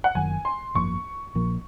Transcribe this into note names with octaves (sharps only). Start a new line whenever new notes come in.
F#5
F#1 F#2 D#3 G#5
C6
G#1 F#2 F3 A#3 C#6
A#1 A#2 F3 A#3